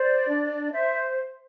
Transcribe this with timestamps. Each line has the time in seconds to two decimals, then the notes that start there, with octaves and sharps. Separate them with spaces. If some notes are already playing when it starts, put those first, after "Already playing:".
Already playing: C5 D5
0.27 D4
0.71 C5 E5